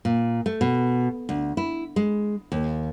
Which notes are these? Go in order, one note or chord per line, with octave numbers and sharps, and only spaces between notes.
A#2
A3
B2
D2
E4
G#3
D#2